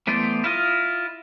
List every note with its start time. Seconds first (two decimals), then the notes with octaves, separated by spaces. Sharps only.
0.07 E3 A3 B3 C5 D5
0.44 E4 F4 D#5